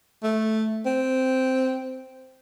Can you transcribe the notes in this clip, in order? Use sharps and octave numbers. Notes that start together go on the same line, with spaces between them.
A3
C4